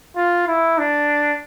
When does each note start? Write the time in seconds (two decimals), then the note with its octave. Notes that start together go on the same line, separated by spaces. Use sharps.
0.16 F4
0.47 E4
0.78 D4